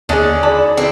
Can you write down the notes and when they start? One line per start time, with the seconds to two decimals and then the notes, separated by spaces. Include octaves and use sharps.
0.09 D#2 D3 D#3 C#4 D4 G#4
0.43 F#4 G#4 D5 A5 B5
0.77 D3 C4 E4